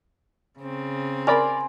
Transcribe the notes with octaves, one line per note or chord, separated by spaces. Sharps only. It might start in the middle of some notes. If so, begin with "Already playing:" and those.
C#3 C4
A#4 D5 G#5 B5 C6